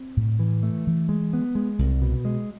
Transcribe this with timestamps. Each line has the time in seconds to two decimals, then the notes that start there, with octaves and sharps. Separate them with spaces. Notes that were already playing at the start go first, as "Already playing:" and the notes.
Already playing: C4
0.17 A2
0.39 E3
0.63 A3
0.87 E3
1.09 G#3
1.33 B3
1.55 G#3
1.79 C2
2.02 B2
2.25 G#3